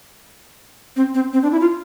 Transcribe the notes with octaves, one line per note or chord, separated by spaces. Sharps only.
C4
C4
C4
D4
E4
F4